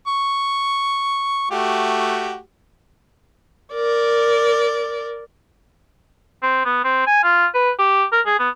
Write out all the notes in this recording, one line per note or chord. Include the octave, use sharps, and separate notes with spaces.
C#6
A3 F#4 G4
A#4 D5
C4
B3
C4
G#5
F4
B4
G4
A#4
G#4
B3